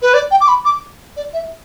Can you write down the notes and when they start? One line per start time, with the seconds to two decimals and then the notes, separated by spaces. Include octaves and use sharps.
0.02 B4
0.13 D5
0.31 G5
0.40 D6
0.48 B5
0.65 D6
1.16 D5
1.33 E5